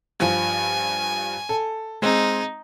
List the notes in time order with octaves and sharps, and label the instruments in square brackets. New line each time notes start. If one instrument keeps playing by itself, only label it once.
[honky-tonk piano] G2 F3 [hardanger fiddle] G#5
[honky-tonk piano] A4
[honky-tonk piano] G#3 C4 [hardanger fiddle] D#4